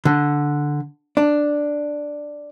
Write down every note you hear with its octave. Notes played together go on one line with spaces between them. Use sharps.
D3
D4